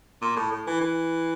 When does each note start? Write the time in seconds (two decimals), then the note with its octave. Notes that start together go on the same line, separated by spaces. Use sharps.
0.21 A#2
0.36 A2
0.51 A2
0.67 E3
0.81 E3